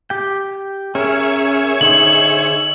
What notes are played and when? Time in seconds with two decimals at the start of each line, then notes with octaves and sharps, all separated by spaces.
0.10 G4 G5
0.95 C#4 G#4 A#4 C#5 E5
1.81 D3 D#4 C5 F#7